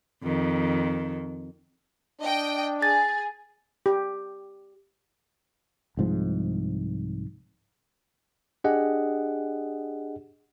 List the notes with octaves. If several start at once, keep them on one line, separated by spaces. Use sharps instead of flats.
F2 D#3
D4 D#5 G5
G#4 G#5 A6
G4
C2 G#2 F3
D4 G4 G#4 D#5 F#5